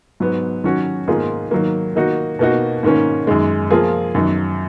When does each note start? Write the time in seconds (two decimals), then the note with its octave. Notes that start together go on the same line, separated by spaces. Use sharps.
0.20 G#2 F#3 B3
0.64 D#3 F#3 C#4 F#4
1.08 G#2 D#3 A#3 F4 G#4
1.51 D#3 F#3 A#3
1.95 D#3 A#3 D#4 F#4
2.39 B2 A#3 D#4 F#4
2.83 G#2 D#3 A#3 C#4
3.27 F#2 D#3 G#3
3.71 F3 A#3 F4 G#4
4.15 F#2 D#3 F#3